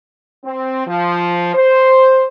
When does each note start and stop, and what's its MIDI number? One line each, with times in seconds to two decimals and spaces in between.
0.45 0.87 60
0.87 1.53 53
1.54 2.25 72